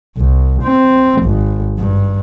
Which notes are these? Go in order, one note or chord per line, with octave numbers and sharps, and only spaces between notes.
C2
C4
G#1
G2